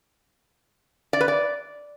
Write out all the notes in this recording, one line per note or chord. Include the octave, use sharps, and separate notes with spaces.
D5
B4
D5